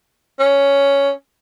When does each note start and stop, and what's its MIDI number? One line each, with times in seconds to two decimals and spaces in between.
0.39 1.11 61